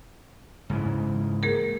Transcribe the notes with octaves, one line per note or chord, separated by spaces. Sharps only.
G#2 C#3 E3
A#3 G#4 A#4